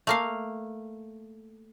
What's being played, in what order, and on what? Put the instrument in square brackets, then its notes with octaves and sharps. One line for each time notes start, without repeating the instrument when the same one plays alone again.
[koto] A3 A#3 F5